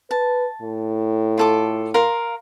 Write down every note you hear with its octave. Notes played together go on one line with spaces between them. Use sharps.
B4 A5
A2
F4 A4 D6
A#4 F5 C6